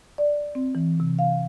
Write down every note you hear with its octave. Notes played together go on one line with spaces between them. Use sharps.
D5
C4
E3
C3
F5